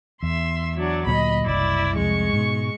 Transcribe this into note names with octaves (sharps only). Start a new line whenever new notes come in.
E2 E5 C6
F#3 D4
D2 A#2 F#3 D#5 B5
F#1 C2 E4 D5
C2 F2 G#3 C#6
G#2 B2